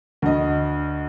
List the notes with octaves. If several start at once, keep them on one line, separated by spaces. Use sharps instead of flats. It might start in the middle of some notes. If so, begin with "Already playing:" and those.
D2 D#5